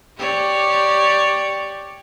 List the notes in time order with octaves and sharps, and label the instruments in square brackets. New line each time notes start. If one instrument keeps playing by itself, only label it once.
[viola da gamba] G4 C#5 D5